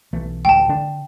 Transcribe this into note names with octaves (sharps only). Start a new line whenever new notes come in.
B1 E3 A3
A1 D2 G#3 G5 A5
D3 D4